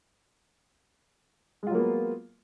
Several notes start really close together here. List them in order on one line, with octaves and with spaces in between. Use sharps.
G#3 F4 F#3 A#3 B3